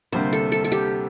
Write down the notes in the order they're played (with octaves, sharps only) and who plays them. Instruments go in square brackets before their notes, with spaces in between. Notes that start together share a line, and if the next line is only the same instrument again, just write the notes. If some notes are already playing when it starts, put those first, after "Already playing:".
[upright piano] D2 C3 G3 A#3 [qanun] C5
[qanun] A4
A4
A4
G4